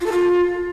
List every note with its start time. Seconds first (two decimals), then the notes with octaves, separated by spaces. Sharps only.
0.01 F4
0.06 A4
0.12 F4